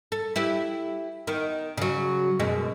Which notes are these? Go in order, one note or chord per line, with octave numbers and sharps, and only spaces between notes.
A4
E4 G4 B4
D#3 B3
C#3 F#3
F#2 B2 G#3